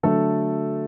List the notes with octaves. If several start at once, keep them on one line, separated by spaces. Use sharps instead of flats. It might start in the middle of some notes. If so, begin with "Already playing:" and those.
D3 F#3 A3 A4